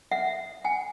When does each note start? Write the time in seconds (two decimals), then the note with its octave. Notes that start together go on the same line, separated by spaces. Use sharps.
0.11 E5 F#5
0.64 F#5 G#5